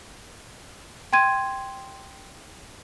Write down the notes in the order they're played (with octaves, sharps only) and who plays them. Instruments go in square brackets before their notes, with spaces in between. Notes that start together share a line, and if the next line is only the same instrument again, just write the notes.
[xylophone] G5 C6 G#6 D#7